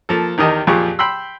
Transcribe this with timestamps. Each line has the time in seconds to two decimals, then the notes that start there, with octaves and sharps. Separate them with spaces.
0.09 F3 A#3 A4
0.38 E2 D#3 G4 A#4 D#5 A5
0.67 F2 A#2 F3 G4 G#4 C#6
0.99 G5 B5 C6 E6